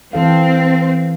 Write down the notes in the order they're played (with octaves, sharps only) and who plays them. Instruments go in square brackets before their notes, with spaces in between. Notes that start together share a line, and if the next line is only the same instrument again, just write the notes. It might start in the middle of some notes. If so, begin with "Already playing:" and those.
[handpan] E3 A4 F5 [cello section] C4